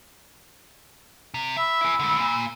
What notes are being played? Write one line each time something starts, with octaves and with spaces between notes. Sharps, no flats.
C3
E5 B5 E6
E4 G#4
D3 G#3
A#2